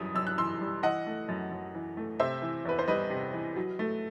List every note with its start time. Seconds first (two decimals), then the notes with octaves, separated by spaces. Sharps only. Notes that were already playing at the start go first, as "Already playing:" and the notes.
Already playing: F#2 E3 G3 D#6
0.15 F#2 E6
0.27 F#6
0.38 E3 C6 E6
0.61 G3
0.83 E3 D#5 F#5
1.06 A3
1.28 F#2
1.51 F#2
1.75 E3
1.97 A3
2.20 C3 C5 E5
2.42 E3
2.65 E2 B4
2.79 C5
2.88 G3 B4 D#5
3.10 C3
3.33 E3
3.56 F#3
3.79 A3